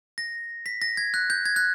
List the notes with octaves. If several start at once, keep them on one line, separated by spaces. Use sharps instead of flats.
A#6
B6
A#6
G#6
F#6
G6
G#6
F#6